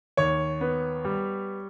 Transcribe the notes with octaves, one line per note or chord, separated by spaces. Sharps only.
D#2 C#5
B3
G3